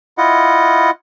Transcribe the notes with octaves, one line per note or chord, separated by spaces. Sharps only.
E4 F4 D#5 F#5